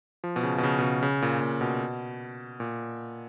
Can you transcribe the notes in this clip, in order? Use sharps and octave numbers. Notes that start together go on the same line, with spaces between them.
F3
B2
C#3
B2
C#3
B2
C#3
C#3
A#2
A#2
B2
A#2